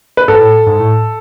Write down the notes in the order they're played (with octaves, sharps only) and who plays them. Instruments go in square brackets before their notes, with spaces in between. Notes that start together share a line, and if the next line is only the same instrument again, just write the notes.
[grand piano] B4
[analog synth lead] G#2 [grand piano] A4
[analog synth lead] A2
G#2
A2